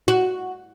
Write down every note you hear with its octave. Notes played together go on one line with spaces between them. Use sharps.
F#4